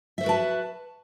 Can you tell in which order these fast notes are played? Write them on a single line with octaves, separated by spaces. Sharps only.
E5 C5 F#4 B4 A5